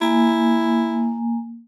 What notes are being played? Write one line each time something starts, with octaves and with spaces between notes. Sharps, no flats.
A#3 E4 G#5